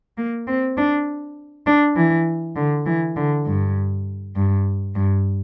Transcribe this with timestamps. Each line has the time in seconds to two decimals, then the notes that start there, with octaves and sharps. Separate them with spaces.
0.18 A#3
0.47 C4
0.77 D4
1.66 D4
1.96 E3
2.56 D3
2.86 E3
3.16 D3
3.46 G2
4.36 G2
4.95 G2